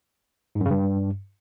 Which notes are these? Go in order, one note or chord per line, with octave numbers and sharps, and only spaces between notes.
G#2
F#2
C#3
G2